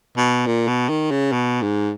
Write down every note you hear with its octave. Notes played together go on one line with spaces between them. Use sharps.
B2
A#2
B2
D#3
C#3
B2
G#2